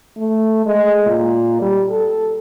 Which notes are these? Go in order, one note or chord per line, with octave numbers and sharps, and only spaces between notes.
A3
G#3
A#2
G3
A4